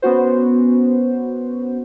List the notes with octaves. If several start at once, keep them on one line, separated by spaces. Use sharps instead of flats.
B3 C#4 F#4 C5